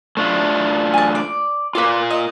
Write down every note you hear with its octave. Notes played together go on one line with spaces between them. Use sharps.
A3 D4 F4
G#5 A5
D5
F4 A#4 B4 F5 D6
D#5